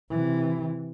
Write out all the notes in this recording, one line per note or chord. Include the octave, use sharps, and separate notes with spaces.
C3 E3